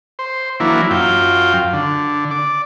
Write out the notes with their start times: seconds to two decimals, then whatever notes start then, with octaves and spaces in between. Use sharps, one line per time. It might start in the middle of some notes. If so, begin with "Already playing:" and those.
0.19 C5
0.60 E3 F#3 A#3 D4 E4
0.90 F#2 F4 G5
1.73 D3
2.31 D5